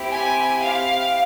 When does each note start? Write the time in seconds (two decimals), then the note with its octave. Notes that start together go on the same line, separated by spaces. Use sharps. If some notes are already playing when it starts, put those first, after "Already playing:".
Already playing: C4 E4 G4
0.12 G#5
0.63 F5